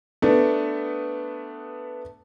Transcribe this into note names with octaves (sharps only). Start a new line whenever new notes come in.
A3 B3 D4